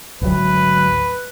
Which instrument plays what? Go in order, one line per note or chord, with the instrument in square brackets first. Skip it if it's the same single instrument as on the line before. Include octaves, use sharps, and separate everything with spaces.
[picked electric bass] G#1 D2 F#3 [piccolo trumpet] B4